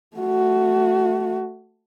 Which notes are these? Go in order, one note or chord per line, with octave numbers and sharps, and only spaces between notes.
A3 F#4